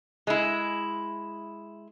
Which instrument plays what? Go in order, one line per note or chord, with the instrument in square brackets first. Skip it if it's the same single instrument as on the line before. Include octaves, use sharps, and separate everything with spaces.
[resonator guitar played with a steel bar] G#3 E4